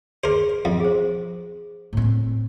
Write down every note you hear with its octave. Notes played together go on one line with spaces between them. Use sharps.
G#4 A#4 C5
F2
G#4 C5
A2 C4